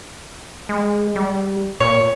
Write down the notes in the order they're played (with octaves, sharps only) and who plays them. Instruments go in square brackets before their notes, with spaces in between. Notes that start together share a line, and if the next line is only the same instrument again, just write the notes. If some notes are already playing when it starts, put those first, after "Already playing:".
[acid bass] G#3
G3
[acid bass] A#2 [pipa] C#5